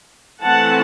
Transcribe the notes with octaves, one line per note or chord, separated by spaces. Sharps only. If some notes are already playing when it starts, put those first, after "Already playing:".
E3 A3 C4 F#5 A5